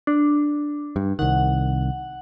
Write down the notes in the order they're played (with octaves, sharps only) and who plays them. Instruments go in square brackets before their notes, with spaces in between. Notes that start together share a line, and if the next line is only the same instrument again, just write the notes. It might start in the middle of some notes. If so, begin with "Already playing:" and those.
[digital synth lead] D4
[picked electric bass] G2
[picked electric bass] C2 D#3 [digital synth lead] F#5